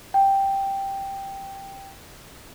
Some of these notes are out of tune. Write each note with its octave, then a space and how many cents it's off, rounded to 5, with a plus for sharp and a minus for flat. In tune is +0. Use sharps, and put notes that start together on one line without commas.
G5 +0